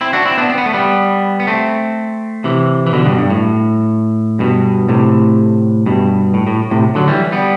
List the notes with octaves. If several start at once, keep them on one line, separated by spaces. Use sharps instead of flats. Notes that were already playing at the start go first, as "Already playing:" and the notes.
C4 E4
D4 F#4
C4 E4
B3 D4
C4
B3
A3
G3 B3
B3
A3 C4
C3 E3
E3
B2 D3
G2 B2
G2
A2
G2 B2
A2 C3
G2 B2
A2
A2
A2 C3
D3 F#3
E3 G3
G3 B3